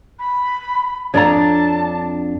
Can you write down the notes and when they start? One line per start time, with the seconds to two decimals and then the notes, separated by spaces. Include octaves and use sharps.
0.19 B5
1.14 F2 D4 C#5 D5 A5 A#5